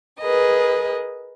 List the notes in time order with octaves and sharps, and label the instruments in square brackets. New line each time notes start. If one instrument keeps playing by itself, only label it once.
[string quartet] G#4 A#4 B4 D#5